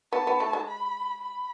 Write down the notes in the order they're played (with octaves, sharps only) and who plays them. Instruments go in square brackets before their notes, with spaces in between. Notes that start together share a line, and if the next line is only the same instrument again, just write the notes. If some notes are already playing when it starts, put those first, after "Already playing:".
[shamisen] B3 [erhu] A5
[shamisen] B3
A3
G#3
[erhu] B5
B5